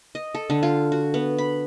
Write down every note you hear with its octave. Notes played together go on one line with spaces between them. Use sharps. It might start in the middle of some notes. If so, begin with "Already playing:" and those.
D#5
A4
D3
F4
F#4
B3
B5